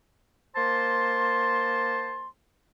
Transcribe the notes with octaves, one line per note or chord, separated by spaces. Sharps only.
A#3 C5 A5 C6